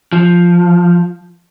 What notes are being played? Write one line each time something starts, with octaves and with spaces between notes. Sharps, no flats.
F3